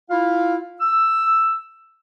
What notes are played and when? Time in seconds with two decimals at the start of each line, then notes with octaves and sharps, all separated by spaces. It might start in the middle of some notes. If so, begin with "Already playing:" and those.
0.10 E4 F4 F5
0.80 E6